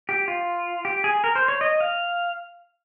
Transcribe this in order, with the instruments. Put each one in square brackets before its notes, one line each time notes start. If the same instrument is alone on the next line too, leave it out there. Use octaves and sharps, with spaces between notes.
[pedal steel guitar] G4
F4
G4
G#4
A#4
C5
C#5
D#5
F5